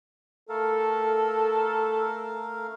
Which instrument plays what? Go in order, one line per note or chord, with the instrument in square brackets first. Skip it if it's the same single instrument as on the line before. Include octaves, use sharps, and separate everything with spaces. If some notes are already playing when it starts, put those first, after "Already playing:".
[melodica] A3 A#4 F5 [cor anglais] A4